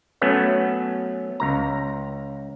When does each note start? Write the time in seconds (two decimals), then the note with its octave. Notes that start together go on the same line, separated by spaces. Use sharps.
0.21 F#3 A3 B3 C#4
1.40 C#2 A#5